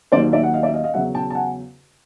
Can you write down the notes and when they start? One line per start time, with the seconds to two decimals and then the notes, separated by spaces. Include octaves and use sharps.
0.12 D#2 D#3 F#3 A#3 C5 D5
0.32 D5 E5
0.43 F#5
0.53 D#5 F5
0.63 D5 E5
0.74 D#5 F5
0.84 D#5 F5
0.94 E2 C#3 F#3 E5 F#5
1.15 G5 A5
1.30 A5
1.35 F#5 G#5